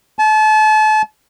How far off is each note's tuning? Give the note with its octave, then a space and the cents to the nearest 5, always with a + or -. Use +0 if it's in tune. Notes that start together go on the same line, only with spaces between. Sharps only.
A5 -35